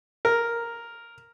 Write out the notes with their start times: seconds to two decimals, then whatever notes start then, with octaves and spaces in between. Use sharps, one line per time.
0.25 A#4